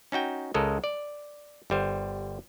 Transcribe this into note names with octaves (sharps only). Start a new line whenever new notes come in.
C#4 D#4 F#4 G5
C#2 G#3 A4 A#4 D#5
D5
G1 G3 C5